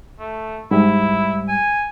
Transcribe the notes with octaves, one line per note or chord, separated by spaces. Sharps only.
A3
G#2 G3 E4
G#5